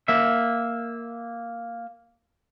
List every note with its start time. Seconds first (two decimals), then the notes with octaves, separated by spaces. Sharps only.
0.08 A#3 E5